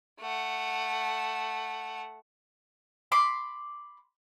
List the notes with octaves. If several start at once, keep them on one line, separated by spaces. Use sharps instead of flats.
A3 F#5
B5 C6 D6